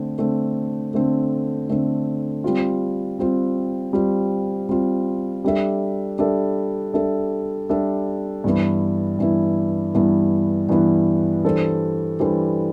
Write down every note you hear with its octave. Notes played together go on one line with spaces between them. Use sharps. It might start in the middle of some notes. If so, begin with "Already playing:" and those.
Already playing: D3 A3 C4
D3 A3 C4
D3 A3 C4
D3 A3 C4
G3 C4 F4
G3 C4 F4
G3 C4 F4
G3 C4 F4
G3 D4 A4 E5
G3 D4 A4 E5
G3 D4 A4 E5
G3 D4 A4 E5
G2 E3 B3 E4
G2 E3 B3 E4
G2 E3 B3 E4
G2 E3 B3 E4
E3 G3 D4 A4 C5
E3 G3 D4 A4 C5